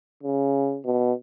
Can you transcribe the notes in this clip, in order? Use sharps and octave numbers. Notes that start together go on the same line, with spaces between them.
C#3
B2